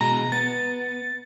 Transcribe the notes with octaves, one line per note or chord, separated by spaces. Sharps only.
B2 G#3 A#5
B3 A6